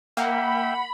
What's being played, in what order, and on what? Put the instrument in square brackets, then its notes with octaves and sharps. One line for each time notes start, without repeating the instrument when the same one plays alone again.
[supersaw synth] A#3 [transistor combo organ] E5 G5 [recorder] F#5 [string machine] B5